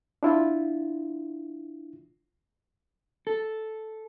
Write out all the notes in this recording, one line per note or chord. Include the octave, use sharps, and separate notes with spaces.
D4 E4 F4
A4